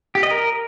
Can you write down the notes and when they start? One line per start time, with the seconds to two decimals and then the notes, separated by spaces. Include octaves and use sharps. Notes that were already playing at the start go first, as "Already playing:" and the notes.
0.15 G4
0.23 D#5
0.31 A#4